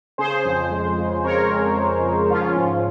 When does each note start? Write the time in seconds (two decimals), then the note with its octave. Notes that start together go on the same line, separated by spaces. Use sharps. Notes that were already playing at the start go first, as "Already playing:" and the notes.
0.18 C#3 G#4 C5
0.45 F2
0.71 G#3
0.98 C#3
1.24 F2 A#4 C#5
1.51 F2
1.77 G#3
2.03 C#3
2.29 F3 C#4 F4
2.56 G#2